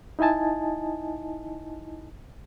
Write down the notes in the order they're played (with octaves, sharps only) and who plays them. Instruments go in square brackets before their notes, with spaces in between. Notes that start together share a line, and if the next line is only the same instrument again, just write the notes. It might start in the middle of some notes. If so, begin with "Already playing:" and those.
[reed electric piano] D#4 E4 D#5 G#5 A5